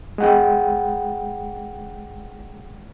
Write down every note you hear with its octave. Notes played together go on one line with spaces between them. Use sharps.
G#3 F#5 G5